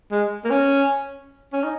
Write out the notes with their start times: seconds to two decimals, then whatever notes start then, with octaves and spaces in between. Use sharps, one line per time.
0.11 G#3
0.44 A#3
0.50 C#4
1.53 C#4
1.64 D#4